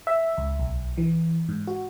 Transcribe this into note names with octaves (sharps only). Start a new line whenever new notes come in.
E5
C#2
B1
E3
G#2
F#4